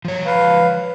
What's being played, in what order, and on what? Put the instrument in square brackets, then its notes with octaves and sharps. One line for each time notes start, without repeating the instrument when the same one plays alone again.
[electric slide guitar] F3 C#5
[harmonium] B4 F5